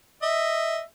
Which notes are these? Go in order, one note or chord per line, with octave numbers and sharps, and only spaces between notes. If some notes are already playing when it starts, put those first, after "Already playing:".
D#5 E5